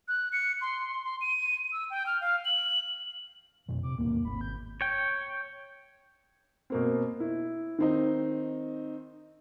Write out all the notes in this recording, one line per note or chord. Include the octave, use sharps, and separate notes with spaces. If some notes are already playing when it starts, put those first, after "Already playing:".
F#6
C#7
C6
C6
C6
D#7
E6
G5
F6
F5
F#7
F2 B2 F#3
C3 D6
D#2 G#2 B2 A#3
G#1 C#3 C4 B5
G6
C#5 G5
B2 A#3 C4
E4
D#3 C4 D#4